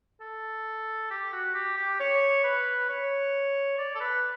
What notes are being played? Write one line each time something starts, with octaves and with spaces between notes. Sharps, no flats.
A4
G4
F#4
G4
G4
C#5
B4
C#5
D5
A4
B4